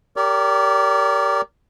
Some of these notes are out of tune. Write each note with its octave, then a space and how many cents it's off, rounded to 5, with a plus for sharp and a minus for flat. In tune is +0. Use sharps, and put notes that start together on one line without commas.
G4 +0 A#4 -15 D5 -40